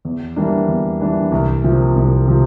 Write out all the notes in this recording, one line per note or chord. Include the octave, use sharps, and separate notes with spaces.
E2
E3 G3 A#3 D4
E2
E3 G3 A#3 D4
C2
C3 F3 A#3
C2
C3 F3